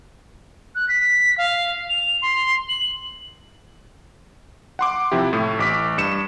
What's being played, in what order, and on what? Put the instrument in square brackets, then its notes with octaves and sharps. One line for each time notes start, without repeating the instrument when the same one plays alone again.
[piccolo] F#6
B6
F5
F7
C6
F#7
[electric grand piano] F#5 C6 D6
C3 F3 E4 G4
A2 A3
A1 D6 B6
G2 C#7 E7